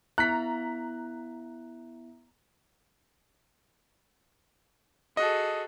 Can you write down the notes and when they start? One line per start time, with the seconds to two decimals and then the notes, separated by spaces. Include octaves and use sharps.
0.18 B3 E4 E5 A#5 F#6 B6
5.17 F#4 G#4 A4 D#5